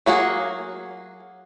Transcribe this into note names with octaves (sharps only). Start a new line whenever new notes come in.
F#3 A#3 F#4 G#4